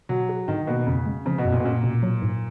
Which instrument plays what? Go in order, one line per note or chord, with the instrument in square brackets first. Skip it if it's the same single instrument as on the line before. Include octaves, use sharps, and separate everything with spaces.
[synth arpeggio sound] B2 [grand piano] F#3
[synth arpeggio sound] G#4
[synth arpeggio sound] G#2 [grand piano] D#3
[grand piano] B2 [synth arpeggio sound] A#3
[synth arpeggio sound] F2 [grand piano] C#3
[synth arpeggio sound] G#3
[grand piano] C#3 [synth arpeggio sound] F3
[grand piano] B2
[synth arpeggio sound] F#2
[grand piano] A#2
B2
[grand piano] A#2 [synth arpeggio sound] C#4
[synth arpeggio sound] B2
F#3
G#2